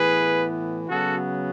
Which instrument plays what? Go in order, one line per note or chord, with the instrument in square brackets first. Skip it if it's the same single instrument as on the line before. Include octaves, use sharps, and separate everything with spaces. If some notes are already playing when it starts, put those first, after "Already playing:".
Already playing: [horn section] A2 E3 B3 G#4 B4
C#3 F#3 B3 F#4 A4